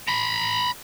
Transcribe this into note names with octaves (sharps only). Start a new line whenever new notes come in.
A#5 B5